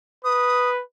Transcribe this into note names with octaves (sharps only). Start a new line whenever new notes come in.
B4 D#6